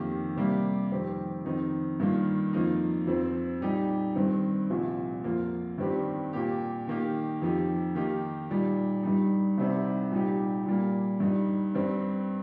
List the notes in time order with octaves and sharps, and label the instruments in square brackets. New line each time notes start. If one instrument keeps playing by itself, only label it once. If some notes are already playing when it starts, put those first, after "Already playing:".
Already playing: [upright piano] F2 D#3 A#3 G4
C3 G3 A#3 G4
F2 D#3 C4 G4
F2 D#3 C4 D#4
G2 D#3 A#3 F4
F2 F3 A#3 D#4
F2 F3 C4
A#2 G3 D#4 G4
G2 D#3 C4
C2 A#2 F3
F2 F3 A#3 F4
G2 D#3 G3 C4 G4
A#2 A#3 G4
D#3 A#3 D#4 G4
F2 F3 D#4 G4
D#3 A#3 D#4 G4
A#2 G3 D#4
G2 G3 D#4
C2 C3 G3 C4 D#4
A#2 G3 D#4 G4
A#2 G3 A#3
G2 G3 D#4
G2 G3 C4